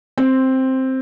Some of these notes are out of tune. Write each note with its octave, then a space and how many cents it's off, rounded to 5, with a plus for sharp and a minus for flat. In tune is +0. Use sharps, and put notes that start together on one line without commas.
C4 +5